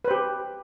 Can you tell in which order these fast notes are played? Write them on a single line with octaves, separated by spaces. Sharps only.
B4 C5 G4